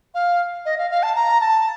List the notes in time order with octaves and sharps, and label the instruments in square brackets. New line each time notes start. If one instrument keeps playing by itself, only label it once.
[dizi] F5
D#5
F5
F5
A5
A#5
A5